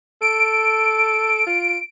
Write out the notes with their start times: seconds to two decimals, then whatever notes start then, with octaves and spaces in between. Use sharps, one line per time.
0.22 A4 D7
1.47 F4